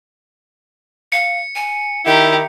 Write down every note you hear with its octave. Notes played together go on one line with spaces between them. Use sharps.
F5 C#7
G#5
D#3 E4 G4 E5 A#5